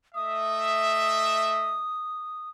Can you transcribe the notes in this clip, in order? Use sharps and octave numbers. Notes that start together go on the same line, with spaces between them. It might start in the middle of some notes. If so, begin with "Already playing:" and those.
A3 D#5 E5 D#6